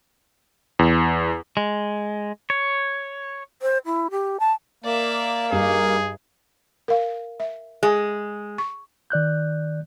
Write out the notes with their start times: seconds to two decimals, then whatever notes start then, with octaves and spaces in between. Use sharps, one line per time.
0.79 E2
1.57 G#3
2.50 C#5
3.62 C5
3.86 E4
4.11 G4
4.40 A5
4.84 A#3 D5 E5
5.52 G2 D#4 G#4
6.88 A#4 F5
7.40 E5
7.83 G#3 G#4
8.58 C#6
9.10 D#3 D5 F#6 G6